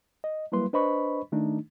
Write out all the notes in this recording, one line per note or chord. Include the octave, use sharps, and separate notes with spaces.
D#5
F#3 G3 A#3 E4 B4 C6
D4 B4 C5 D#5 B5 C#6
D#3 A3 D4 D#4